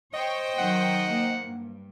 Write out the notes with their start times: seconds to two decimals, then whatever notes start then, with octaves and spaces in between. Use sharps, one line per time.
0.14 C5 C#5 D#5 G5
0.59 D#3 F#3 F#5
1.06 A#3
1.43 G2